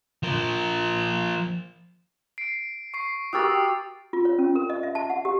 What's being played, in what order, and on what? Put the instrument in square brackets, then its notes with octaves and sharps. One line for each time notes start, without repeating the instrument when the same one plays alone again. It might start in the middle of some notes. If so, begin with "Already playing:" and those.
[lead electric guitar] F3 A#4
[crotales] C7 D7
C#6 C7
[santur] F#4 G4 A#4 [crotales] D#6 E6 A6
[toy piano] F4
C#5
C#4
A#4
D#5
E5
A5
F#5
G4